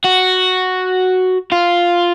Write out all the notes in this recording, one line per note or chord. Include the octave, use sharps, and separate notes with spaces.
F#4
F4